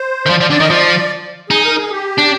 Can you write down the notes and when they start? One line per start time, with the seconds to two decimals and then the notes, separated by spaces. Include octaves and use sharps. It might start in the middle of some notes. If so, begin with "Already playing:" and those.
Already playing: C5
0.26 D#3
0.30 F3 D5
0.40 F3 D5
0.50 D3 D5
0.60 D#3 D#5
0.70 F3 D5
1.50 D#4 G#4
1.64 A#4
1.77 G#4
1.91 G4
2.19 D4